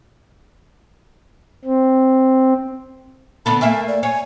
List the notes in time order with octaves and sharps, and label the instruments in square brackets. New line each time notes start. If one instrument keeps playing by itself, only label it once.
[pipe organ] C4
[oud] D3 B3 A4 [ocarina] B5
[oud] A3 A#3 E5 [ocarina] G#5
[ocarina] D5
[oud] C#5 [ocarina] G#5